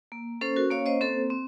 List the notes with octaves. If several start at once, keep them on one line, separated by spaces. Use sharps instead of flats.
A#3
C#4 A4 C5
F#4 A#4
A#3 C#5 F5
C5 D#5
C4 A4 C5
C4